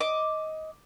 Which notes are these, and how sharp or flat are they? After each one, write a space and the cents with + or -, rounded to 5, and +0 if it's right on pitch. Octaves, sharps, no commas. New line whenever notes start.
D#5 +15 D6 +0